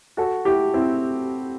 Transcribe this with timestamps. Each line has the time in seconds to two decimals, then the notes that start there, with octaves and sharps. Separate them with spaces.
0.17 F#4 A4
0.45 E4 G4
0.74 C4 E4